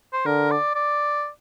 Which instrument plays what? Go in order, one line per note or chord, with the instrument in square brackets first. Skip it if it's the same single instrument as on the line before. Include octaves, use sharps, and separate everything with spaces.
[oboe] C5
[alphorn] D3 [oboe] A#4
[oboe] D5
D5